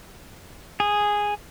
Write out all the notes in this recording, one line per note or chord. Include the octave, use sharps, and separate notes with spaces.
G#4